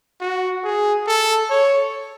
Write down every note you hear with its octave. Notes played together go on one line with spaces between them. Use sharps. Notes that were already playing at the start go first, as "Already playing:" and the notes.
F#4
G#4
A4
C#5